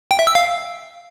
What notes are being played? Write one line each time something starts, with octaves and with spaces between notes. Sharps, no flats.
G5
E5
E6
F5